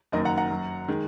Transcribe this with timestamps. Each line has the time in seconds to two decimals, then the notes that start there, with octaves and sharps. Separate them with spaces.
0.12 F#1 F#2 D#3 F#3 A#4 D#5
0.25 F#5 A#5
0.38 F#5 A#5
0.50 F#2 F#3
0.88 D#3 G#3